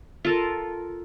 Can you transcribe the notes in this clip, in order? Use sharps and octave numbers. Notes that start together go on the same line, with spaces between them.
F4 A4 A#4